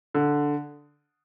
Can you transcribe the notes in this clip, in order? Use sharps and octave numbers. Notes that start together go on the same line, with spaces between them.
D3